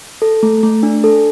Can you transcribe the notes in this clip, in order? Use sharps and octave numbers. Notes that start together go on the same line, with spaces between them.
A4
A3
A3
D4
A4